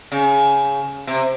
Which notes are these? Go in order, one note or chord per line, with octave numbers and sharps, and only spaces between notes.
C#3
C3